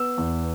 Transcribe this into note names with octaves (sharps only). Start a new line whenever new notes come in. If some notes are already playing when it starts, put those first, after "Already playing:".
Already playing: B3 E6
E2